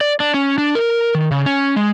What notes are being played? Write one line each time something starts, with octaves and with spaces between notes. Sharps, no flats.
D5
D4
C#4
D4
A#4
D#3
C#3
C#4
G#3